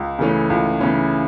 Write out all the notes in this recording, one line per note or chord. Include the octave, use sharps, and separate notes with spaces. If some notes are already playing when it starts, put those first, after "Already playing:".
Already playing: C#2
C#3 E3 A3 C#4
C#2
C#3 E3 A3 C#4